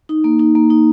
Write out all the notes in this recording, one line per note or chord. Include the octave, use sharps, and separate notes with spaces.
D#4
A#3
D#4
A#3
D#4